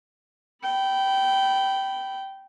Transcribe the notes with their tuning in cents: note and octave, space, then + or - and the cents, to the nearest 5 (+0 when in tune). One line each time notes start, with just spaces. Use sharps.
G5 -15 B5 +0